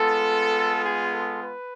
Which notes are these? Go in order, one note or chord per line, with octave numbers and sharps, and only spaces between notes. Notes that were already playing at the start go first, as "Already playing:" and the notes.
Already playing: G#3 B3 F4 A4
G#4
A4
B4